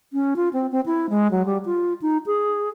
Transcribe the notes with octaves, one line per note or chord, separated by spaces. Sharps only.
C#4
F4
C4
C4
E4
G#3
F#3
G3
F4
D#4
G#4